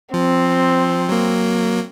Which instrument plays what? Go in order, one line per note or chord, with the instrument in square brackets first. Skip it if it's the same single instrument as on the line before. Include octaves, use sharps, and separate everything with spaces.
[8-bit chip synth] F3 [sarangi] C4
[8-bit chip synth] F#3 A#3